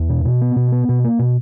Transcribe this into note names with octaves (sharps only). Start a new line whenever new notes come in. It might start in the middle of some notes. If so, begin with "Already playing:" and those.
Already playing: E2
B2
B2
B3
B2
B3
B2
A#3
B2